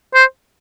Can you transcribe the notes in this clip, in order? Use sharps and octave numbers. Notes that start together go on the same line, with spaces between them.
C5